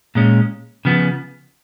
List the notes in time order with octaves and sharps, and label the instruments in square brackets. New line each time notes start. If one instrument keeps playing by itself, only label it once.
[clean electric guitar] A#2 G#3 C#4
C#3 F3 B3